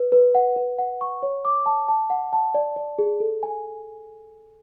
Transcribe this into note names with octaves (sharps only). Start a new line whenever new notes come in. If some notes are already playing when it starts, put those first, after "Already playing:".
Already playing: B4
B4
F#5
B4
F#5
C#6
C#5
D6
A5
A5
F#5
A5
D5
D5
G#4
A4
G#5